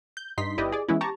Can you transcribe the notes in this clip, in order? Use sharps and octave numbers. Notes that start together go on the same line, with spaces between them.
G6
G2 D#4 C6 B6
G1 E4 G4 B4 D5 D#5
G#4 D5
E3 G#3 B3 C#4 E4
G4 A5 A#5 C#6